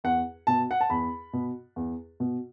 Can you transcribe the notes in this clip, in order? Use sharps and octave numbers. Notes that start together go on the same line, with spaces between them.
E2 F#5
B2 A5
F#5
A5
E2 B5
B2
E2
B2